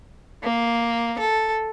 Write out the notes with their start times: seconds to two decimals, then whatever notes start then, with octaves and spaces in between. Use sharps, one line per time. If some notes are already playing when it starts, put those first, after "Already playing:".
0.43 A#3
1.19 A4